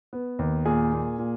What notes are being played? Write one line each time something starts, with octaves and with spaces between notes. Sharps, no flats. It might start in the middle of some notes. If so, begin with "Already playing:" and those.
B3
D#2
A#2 G#4
A#2
A#2